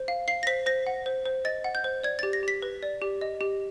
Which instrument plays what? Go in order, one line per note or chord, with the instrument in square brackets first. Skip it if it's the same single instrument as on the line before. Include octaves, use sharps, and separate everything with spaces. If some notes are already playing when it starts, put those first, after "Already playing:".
Already playing: [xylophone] C5
F5
F5 C7
A#6
C5 B6
C5 A#6
F#5
C5
C5
D#5 A6
F#5
G6
C5
D5 G#6
A6
G4
A#6
G4 B6
B4
D5
G4
D#5
G4